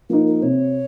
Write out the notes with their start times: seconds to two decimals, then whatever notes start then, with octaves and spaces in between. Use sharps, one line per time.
0.09 F3 A#3 D#4 A#4
0.26 A#4
0.42 C3 C#5